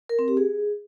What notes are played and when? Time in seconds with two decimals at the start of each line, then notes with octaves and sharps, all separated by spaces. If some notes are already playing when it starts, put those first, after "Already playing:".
0.09 A#4
0.19 C4
0.28 G4
0.37 G#4